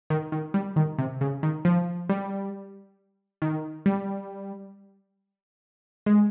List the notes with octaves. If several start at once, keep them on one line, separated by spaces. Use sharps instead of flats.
D#3
D#3
G3
D#3
C3
C#3
D#3
F3
G3
D#3
G3
G#3